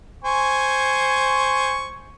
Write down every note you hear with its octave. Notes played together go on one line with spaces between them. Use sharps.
C5 G#5 C#6